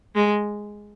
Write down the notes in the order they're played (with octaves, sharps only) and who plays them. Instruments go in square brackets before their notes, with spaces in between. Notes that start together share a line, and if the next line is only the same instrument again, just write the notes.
[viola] G#3